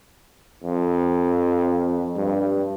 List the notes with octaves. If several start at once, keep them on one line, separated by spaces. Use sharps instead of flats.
F2
G2